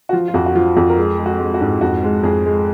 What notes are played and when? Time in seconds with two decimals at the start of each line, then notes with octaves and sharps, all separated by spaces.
0.09 F#4
0.13 F3 F4
0.28 F4
0.34 F2 F#4
0.46 F#4
0.55 F3 F4
0.77 F2 F#4
0.90 A#4
0.97 G#3 G#4
1.18 G#3
1.26 F#4
1.40 G#3
1.54 F#4
1.61 G#2
1.81 F2 F#4
2.03 G#3
2.23 F2 G#4
2.45 G#3